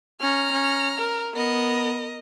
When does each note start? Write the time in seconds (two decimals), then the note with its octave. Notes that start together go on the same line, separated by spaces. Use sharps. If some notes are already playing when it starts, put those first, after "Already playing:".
0.21 C#4 A#5 F6
0.52 C#4
0.98 A#4
1.35 B3 A#4 D#5